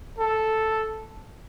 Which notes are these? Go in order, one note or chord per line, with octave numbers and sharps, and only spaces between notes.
A4